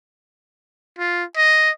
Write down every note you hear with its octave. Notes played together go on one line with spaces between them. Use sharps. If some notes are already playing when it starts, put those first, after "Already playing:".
F4
D#5